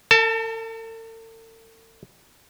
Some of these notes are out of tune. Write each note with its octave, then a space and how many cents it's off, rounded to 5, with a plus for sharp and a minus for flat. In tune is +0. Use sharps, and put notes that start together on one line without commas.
A4 +45 A5 +0